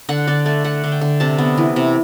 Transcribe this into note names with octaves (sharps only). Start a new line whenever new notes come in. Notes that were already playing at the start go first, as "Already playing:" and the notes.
D3 F#5
D3 D5
A3 D5
A3 F#5
D3
G5
D3
C3 A5
B3
E3
C3